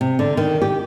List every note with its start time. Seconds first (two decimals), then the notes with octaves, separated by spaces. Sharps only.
0.01 C3
0.19 D3
0.37 D#3
0.62 G4